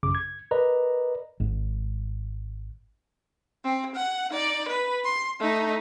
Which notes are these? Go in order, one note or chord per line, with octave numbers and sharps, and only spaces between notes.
A1 F#2 C#3 D6
G#6
A#4 B4 D5 D#5 A#5
G#1 G#2
C4
F#5
D#4 D5
B4
C6
A3 D#4